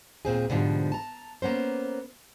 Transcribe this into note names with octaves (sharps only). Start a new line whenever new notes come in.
D#2 A#2 C4 G#4
G#2 B2 D3 E3 F3 G3
A5 A#5
A#3 B3 C#4 C5